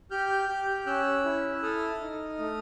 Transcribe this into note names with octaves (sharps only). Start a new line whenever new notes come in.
G4 F6 G6
G4
C#4 E6 F#6
E4
A4 D#6 F6
D#4
A3